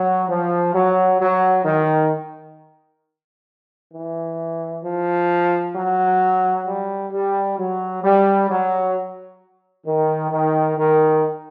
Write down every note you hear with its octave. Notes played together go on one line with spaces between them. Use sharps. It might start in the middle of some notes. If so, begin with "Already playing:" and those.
Already playing: F#3
F3
F#3
F#3
D#3
E3
F3
F#3
G3
G3
F#3
G3
F#3
D#3
D#3
D#3